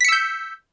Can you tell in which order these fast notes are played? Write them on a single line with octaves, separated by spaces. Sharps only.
B6 C#7 E6 G6